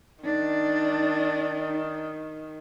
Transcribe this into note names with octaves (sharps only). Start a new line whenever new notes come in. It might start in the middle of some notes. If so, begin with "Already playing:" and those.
D#3 D4 D#4